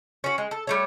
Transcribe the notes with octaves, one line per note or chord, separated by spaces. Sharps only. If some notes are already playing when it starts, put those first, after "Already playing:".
C#4 F#4
G#3
A4
G3 A3 C#5